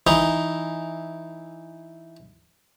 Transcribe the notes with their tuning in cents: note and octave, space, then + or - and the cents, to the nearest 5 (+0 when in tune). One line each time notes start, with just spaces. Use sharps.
E3 +0 D#4 +0